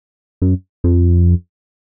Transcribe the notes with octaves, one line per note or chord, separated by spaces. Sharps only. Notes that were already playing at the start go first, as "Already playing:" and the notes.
F#2
F2